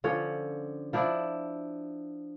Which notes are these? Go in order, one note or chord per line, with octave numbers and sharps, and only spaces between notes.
D3 F3 C#4 C#5
F3 D4 E4